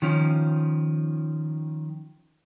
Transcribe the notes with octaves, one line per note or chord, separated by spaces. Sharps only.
D#3 F3 C#4